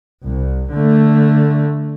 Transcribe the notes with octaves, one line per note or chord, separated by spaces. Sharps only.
C2
D3 A3